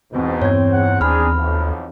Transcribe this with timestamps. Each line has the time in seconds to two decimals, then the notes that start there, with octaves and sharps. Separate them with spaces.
0.12 E2 G#2 B2 C4
0.42 G2 C#5 G#6
0.72 G#2 F#5
1.01 D#2 D4 D#4 G#4 B5 F6
1.35 B1 F2